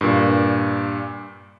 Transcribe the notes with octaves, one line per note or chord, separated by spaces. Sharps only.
G2 A#2